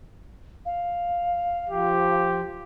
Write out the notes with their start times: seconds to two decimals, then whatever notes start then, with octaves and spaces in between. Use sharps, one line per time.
0.65 F5
1.69 F3 G4